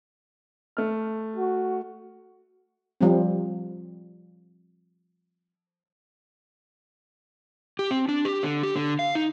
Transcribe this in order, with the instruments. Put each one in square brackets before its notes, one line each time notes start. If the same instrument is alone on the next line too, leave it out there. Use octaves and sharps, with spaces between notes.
[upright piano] A3 F6
[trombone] F#4
[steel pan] F3 G3 C4
[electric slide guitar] G4
C4
D4
G4
D3
G4
D3
F5
D#4